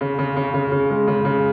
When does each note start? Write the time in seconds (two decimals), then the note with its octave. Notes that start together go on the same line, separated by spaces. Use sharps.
0.01 C#3
0.19 C#3
0.37 C#3
0.54 C#3
0.72 C#3
0.90 G#3
1.08 C#3
1.25 C#3